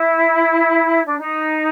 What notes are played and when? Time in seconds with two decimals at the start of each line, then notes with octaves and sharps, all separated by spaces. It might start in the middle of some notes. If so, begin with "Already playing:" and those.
Already playing: E4
1.05 D4
1.18 D#4